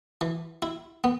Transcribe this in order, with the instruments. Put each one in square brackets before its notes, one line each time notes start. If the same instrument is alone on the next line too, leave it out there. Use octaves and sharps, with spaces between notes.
[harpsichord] E3
E4
B3